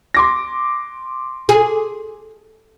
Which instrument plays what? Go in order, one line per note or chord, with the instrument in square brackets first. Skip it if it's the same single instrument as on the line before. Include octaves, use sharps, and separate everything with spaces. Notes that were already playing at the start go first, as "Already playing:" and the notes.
[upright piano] C6 D6 A#6
[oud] G#4